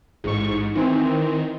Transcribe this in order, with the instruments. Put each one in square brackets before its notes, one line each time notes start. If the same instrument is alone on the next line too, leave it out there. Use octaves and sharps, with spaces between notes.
[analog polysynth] A1 C#6 [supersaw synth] G#2
[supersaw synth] D#3 [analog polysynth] E3 C4